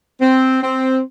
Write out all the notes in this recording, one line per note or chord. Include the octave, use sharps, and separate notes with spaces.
C4
C4